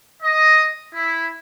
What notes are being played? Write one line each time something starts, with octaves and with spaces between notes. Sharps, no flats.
D#5
E4